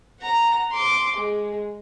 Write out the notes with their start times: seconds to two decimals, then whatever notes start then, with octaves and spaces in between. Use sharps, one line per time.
0.21 F#5 A#5
0.72 C6 D6
1.15 G#3